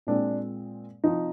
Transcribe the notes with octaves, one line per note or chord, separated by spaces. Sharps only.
A#2 G#3 C4 D4
C3 F3 C4 D#4